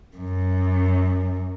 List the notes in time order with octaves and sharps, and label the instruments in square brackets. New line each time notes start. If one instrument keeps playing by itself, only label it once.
[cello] F#2